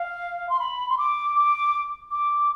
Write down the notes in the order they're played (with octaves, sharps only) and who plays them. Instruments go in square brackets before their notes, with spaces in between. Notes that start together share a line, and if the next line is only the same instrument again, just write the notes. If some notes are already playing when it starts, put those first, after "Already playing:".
Already playing: [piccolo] F5
C6
B5
C6
D6
D6
D6